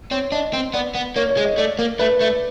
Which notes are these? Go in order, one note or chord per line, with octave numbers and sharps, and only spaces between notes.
C4 C#5
D4 D#5
C4
B3 D5
B3
A#3 C#5
C#5
G#3
D#5
A3 D5
A#3
A3 B4
A3